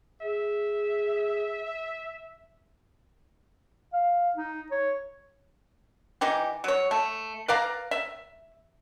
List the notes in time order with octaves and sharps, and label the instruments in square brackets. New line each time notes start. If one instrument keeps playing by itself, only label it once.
[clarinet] G#4 [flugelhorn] E5
[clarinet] F5
D#4
C#5
[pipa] E3 D#4 G4
F#3 C#5
A3
B4 D5 F5 A#5
E5